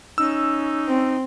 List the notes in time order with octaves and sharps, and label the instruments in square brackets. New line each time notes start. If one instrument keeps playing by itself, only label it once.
[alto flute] C#4 [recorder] D#4 [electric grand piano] E6
[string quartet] C4